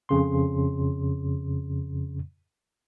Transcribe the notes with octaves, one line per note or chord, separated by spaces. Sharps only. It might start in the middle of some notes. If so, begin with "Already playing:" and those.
F2 C#3 C6